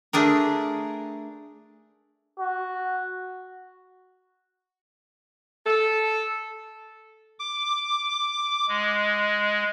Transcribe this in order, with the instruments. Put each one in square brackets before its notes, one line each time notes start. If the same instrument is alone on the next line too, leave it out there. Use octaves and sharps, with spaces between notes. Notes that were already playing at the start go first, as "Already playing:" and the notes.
[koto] A3 D4 G#4 A#4
[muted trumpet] F#4
[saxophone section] A4
[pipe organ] D6
G#3